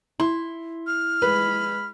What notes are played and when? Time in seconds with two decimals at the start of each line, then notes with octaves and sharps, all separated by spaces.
0.20 E4 C6
0.87 F6
1.22 G#3 B4 B5